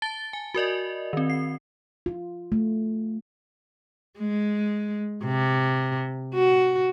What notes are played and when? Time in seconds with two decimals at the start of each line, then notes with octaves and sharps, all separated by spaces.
0.02 A5 A6 G7
0.33 G#5
0.54 F#4 A#4 D5 D#5
1.13 D#3 C4
1.30 C7
2.06 F4
2.52 A3
4.18 G#3
5.25 C3
6.34 F#4